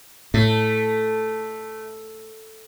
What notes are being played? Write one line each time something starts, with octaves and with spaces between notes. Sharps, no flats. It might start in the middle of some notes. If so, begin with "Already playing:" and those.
A2 A3